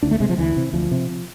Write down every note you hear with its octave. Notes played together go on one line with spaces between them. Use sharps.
D2 D4
A3
C3 G#3
F3
D2 E3
C3
D2 F3
C3